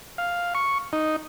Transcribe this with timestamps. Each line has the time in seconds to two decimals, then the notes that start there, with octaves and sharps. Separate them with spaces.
0.18 F5
0.55 C#6
0.93 D#4